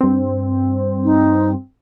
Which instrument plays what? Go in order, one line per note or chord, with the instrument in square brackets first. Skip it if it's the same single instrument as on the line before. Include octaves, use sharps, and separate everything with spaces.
[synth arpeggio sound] G2 C4
[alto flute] D#4